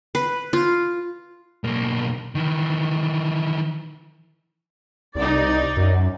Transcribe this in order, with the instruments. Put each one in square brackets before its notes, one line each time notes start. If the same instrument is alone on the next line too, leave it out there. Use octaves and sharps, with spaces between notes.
[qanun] B4
F4
[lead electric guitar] B1 A#3
D#3 E3
[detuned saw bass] C2 [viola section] D#4 D5
[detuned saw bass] F#2